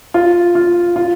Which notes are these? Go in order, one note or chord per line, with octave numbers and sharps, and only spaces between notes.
F4
F4
F4